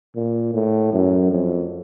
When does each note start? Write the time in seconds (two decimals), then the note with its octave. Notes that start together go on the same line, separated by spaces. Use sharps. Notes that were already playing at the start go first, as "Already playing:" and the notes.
0.15 A#2
0.54 A2
0.92 F#2
1.31 F2